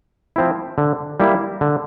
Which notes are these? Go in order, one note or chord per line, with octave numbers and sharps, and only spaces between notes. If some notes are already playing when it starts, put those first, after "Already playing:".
F3 C4 E4
D3
G3 A#3 E4
D3